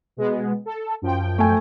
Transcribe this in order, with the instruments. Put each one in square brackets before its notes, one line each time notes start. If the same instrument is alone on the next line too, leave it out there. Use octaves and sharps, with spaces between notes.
[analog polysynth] B2 G#3 B3
A4
F#2 F3 G5
[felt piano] A3 G#5